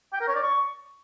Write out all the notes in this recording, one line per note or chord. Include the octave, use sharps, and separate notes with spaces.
G5
A#4
C#5
D5
C#6